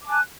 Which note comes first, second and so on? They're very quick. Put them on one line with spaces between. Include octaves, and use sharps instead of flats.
D6 A5 G#5 F#6